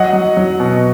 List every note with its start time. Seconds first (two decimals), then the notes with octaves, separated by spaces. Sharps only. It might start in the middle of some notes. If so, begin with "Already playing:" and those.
Already playing: F#3 D#5 F#5
0.13 F#3
0.37 F#3
0.60 B2